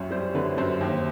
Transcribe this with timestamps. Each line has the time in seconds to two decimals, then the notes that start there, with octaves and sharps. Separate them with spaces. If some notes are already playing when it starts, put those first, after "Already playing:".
Already playing: C2 F#2 C#5
0.11 G3 C5
0.35 D3 B4
0.58 F#2 C5
0.81 D#2